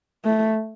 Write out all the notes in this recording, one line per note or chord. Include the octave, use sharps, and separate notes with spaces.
A3